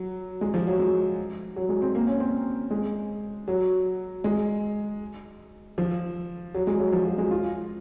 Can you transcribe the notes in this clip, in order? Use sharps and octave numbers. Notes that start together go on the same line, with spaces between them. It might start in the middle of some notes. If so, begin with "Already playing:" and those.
Already playing: F#3
G#3
F3
F#3
G#3
F#3
G#3
C4
A#3
C#4
C4
G#3
F#3
G#3
F3
F#3
G#3
F#3
F3
F#3
G#3
F4